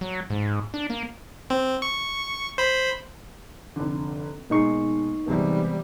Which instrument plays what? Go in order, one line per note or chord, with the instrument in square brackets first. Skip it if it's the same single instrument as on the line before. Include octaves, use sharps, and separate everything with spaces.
[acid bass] F#3
G#2
D4
A#3
[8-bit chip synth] C4
C#6
C5 B5
[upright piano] F1 D3
[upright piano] B1 G#3 C7 [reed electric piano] A#3 D#4 C#6
[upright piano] C3 G#3 B3 [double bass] E3 G3